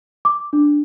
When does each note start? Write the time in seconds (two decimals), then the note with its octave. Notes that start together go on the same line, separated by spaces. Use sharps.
0.25 D6
0.53 D4